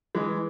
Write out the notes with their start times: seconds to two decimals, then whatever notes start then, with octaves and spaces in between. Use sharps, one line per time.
0.15 E3 G#3